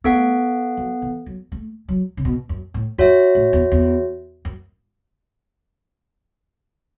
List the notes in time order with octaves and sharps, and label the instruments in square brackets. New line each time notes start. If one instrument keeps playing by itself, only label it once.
[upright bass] A3 [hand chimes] B3 A4 F#5
[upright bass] F#3
E3
F#3
A3
F#3
C#3
B2
F#2
A2
[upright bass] F#2 [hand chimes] F#4 C#5 E5
[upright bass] A2
E2
E2
F#2